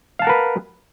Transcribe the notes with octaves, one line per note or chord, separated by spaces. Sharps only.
A#4 B4 F5 F#5 A5